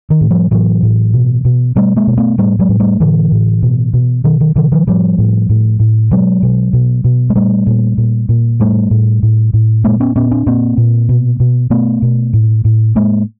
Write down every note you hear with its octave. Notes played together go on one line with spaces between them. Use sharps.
D#3
A2
F3 G3
A2 E3 F#3
A2
B2
B2
B2 G3 A3
G#3 A#3
B2
A3 B3
A2 G3 A3
F#3 G#3
A2
G3 A3
A2 D3 E3
A2
B2
B2
B2 D#3
D#3
B2 D3 E3
D#3 F3
A2 F3 G3
A2
A2
A2
B2 F#3 G#3
B2
B2
B2
G#3
A#2 G3 A3
A#2
A#2
A#2
A2 G3 A3
A2
A2
A2
A#2 G#3 A#3
B3 C#4
A#2 B3 C#4
C4 D4
A#2 A#3 C4
A#2
B2
B2
B2 A3 B3
B2
A2
A2
A2 G#3 A#3